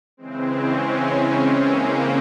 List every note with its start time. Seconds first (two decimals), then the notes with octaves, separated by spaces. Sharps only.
0.17 C#3 E3 G#3 C4
0.64 C#4
1.12 C#4
1.59 A#3